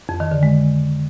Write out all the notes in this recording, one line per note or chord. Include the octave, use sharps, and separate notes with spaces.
F2
D#3
D3
G#3